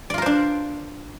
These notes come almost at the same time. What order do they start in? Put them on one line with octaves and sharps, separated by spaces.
D5 F4 A#4 C5 D4